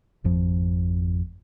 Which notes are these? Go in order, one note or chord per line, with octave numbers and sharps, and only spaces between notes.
G#1 F2 F3